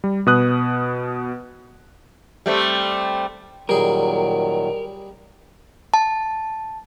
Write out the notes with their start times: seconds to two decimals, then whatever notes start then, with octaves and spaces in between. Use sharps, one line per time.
0.04 G3
0.26 B2 B4 D#6 F#6
2.46 G3 A3 C4
3.69 A#2 D#3 F#3 G3 G#4 A#4
5.94 A5